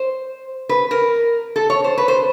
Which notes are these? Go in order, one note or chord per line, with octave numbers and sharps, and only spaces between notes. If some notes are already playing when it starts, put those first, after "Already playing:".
Already playing: C5
B4
A#4
A4
C#5
C5
B4
C5